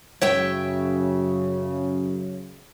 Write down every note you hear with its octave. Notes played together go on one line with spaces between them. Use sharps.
F#2 C#3 C#5 E5 G5